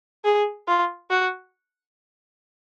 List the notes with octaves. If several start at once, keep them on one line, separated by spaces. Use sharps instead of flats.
G#4
F4
F#4